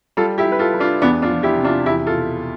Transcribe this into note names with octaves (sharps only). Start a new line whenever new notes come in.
G3 F4 A4
E4 G4
G3
B4
F4 A4
G3
D4 F4
E2 B3 D4
D4 F4
F3
E4 G4
C3
D4 F4
E2 E4 G4
F4 A4
B2